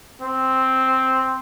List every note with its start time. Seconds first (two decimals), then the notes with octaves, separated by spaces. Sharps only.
0.22 C4